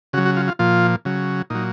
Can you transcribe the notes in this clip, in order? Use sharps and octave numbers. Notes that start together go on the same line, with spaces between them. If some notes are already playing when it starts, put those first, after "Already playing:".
C#3 F#3 F#4
F#4
F4
F4
A#2 F3 F4
C#3 F#3
A#2 F#3 D#4